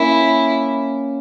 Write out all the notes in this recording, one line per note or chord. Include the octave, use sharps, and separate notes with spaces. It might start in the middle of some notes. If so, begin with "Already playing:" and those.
Already playing: A#3 C#4 E4